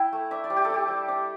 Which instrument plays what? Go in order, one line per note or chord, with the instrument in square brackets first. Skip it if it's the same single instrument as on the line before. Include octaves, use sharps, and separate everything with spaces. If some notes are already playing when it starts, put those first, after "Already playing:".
Already playing: [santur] E4 G5
A3
D4 E5
D5
G3
G4
A4
D4 G4
G3
D4